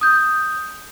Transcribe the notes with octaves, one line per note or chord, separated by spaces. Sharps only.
D#6 G6